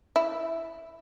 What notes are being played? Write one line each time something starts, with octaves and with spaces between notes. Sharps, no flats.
E4